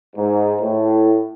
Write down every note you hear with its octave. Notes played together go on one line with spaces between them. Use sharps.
G#2
A2